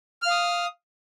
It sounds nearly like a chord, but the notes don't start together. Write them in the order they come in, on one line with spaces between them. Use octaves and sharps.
F6 F5 D#6